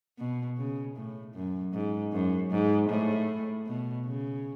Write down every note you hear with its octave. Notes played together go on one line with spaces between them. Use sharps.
B2
C#3
A2
F#2
G#2
F#2
G#2
A2
B2
C#3